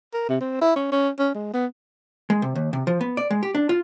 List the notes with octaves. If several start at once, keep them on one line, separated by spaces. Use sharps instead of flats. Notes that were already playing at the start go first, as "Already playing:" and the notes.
A#4
C3
C4
E4
C#4
C#4
C#4
G#3
B3
G#3
C3
D#2
C3
F3
B3
D5
G#3
G4
D4
F4